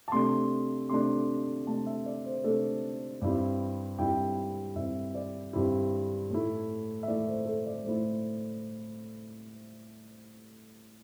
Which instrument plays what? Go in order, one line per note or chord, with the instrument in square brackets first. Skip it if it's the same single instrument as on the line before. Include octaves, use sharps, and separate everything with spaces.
[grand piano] A5
C3 A3 D4 C6
C3 A3 D4 C6
C3 A3 D4 A5
E5
D5
C5
C3 A3 D4 A4
G2 G3 C4 E4
G2 G3 C4 E4 G5
G2 G3 C4 E4 E5
D5
G2 G3 C4 E4
A2 A3 E4
E5
A2 A3 E4 D5
C5
A4
D5
A2 A3 E4 C5